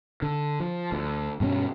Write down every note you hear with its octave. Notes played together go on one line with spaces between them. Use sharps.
D3
F3
D2
G2 B2 G#3 C#4